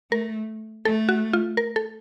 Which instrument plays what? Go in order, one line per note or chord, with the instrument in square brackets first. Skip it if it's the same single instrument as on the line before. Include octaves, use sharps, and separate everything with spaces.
[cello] A3 [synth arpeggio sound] A#4
[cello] A3 [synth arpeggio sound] A4
[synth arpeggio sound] F#4
F4
A#4
A4